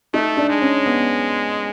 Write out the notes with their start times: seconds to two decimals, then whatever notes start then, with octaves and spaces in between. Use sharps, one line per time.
0.14 A3 D#4
0.37 D4
0.49 G#3
0.62 C#4
0.86 B3